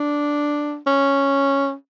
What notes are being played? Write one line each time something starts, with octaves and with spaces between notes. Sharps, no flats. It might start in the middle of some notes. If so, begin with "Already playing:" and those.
Already playing: D4
C#4